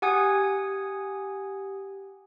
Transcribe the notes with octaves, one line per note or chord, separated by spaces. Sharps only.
G4 F#5 G#5 D#6 G#6